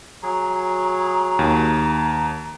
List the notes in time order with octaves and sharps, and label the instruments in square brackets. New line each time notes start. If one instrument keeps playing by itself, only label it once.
[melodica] F#3 G#4 [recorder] A#5
[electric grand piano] D#2